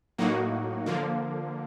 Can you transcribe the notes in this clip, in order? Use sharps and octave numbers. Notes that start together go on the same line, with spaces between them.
A2 F#3 A#3 D#4 F#4
D3 F3 A#3